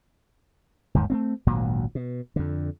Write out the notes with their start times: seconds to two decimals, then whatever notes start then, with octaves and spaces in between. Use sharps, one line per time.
0.94 G1 D#2 G#2 D#3
1.10 A3 B3 C4
1.47 G#1 D2 A#2 F#3
1.95 B2
2.36 F2 D3